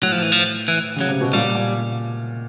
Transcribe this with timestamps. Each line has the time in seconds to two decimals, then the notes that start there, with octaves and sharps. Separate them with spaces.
0.02 A2 F#3
0.12 F3
0.22 E3
0.32 F3
0.68 E3
0.96 C#3 F#3
1.09 C3
1.21 B2
1.33 A#2 G3
1.55 A#2